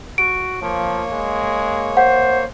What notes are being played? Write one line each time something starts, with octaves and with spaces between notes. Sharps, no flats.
F#4 D7
F3 A#3 C#5
G#3
C5 F#5